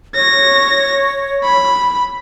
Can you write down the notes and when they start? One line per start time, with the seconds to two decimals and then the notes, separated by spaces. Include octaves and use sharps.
0.15 C#5 A#6
1.43 B5